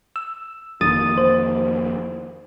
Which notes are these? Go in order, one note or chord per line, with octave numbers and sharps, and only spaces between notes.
E6
G1 F2 D#3 A#3 D#6 A6 D#7
C5